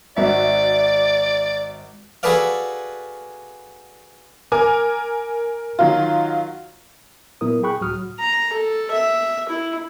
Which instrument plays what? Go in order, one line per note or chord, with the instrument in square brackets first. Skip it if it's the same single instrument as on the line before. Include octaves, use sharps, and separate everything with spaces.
[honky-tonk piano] G#1 F#4 E5 [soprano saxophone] D5
[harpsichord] F#4 G#4 A4 B4 D5 F5
[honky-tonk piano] A#4 G#5 D6 F6
D#3 F#3 F4
[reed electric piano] A#2 F#3 B3 E4 A#4 D#6
G#4 G5 B5 C#6 F#6
C#2 A2 F#3 F#4 D#6 F6
[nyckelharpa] A#5
A4
E5
E4